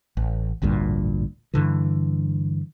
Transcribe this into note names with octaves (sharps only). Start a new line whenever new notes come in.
A1
A1 D2 G2 A#2
G2 D3 E3